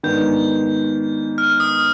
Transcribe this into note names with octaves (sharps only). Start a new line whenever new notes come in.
G#2 D#3 B3 D4 G6
F6
D#6